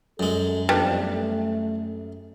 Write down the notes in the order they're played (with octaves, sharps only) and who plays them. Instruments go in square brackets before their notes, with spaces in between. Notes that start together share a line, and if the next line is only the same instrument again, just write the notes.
[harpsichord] F#2 G#3 [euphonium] A4
[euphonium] F2 [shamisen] G3 B3 D4
[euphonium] A3